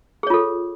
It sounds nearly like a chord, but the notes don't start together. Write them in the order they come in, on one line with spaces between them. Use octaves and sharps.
G#4 C#5 F4 A4